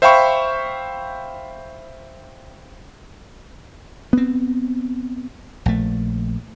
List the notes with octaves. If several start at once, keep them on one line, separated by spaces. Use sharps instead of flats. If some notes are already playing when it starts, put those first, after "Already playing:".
C5 E5 F5 G5 B5 C#6
B3 C4
A#1 A3